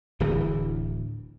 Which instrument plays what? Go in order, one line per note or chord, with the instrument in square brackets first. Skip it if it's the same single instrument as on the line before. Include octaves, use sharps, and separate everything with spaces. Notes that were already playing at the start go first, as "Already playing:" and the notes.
[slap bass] D1 D2 E3